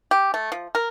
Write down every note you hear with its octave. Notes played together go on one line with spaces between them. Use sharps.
G4
A3
F3
A#4